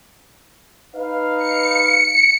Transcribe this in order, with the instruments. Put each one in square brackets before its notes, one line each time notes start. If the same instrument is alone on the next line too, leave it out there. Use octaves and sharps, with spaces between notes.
[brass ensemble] D#4 B4 F5
[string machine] C#7